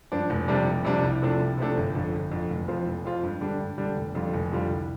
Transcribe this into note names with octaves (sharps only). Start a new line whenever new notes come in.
G2 F3 D4
F1
F2 C3 G3 D4
F1
F2 C3 G3 D4
C2
C3 F3 A3 D4
C2
C3 F3 A3 D4
G1
F2 D3
G1
F2 D3
F1
F2 F3 C4 F4
F1
F2 F3 C4 F4
G2
D3 G3 D4
G2
D3 G3 D4
F1
F2 D3 G3 F4
F1
F2 D3 G3 F4
C2